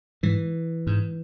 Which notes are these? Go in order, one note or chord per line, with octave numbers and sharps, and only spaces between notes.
G#2 E3
G#2